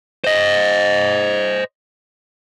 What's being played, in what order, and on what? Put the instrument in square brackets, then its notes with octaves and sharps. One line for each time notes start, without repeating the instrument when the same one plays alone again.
[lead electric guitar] C5 D#5